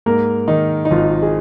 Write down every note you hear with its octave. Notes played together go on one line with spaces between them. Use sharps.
G#2 A#3 A#4
D#3 D#4
D#4
G#1 F4
G#4